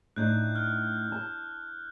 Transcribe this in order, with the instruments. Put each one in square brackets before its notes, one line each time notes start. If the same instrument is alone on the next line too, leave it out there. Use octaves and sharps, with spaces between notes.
[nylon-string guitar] A2 D4 D#4 [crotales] F#6 G6
[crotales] F6 F#6
[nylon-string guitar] A5